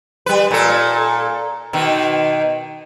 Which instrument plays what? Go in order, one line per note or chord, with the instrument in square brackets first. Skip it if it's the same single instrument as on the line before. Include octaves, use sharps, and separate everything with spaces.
[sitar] G3 B4
A#2 A4
B2 D#3